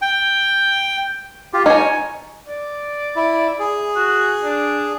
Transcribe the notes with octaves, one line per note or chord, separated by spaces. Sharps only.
G5
F4 G4
D#4 C#5 G#5
D5
E4
G#4
F#4
D4